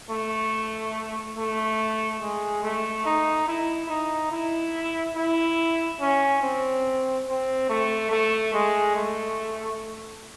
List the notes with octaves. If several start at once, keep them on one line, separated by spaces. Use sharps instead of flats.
A3
A3
G#3
A3
D#4
E4
D#4
E4
E4
C#4
C4
C4
A3
A3
G#3
A3